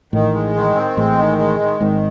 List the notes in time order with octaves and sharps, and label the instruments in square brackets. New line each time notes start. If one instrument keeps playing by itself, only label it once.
[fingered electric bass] A1 A2 [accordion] D#3
[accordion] G#3
D#3
C4
[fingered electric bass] A1 A2 [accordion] G#3
[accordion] D#3
G#3
D#3
[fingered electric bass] G#1 G#2 [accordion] D#3